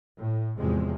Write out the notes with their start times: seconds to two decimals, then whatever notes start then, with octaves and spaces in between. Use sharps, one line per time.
0.18 A2
0.58 E2 A2 C3 F3 G#3